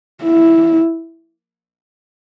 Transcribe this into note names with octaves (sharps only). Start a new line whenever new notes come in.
E4